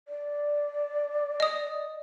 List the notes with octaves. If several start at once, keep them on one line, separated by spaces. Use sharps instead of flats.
D5
D#5 D#6